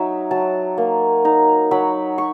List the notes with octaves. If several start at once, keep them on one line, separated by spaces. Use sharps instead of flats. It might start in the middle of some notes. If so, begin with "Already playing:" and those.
Already playing: F#3 D#4 E5
F#3 A5
A#3
D#4 A#5
F#3 B5
C#6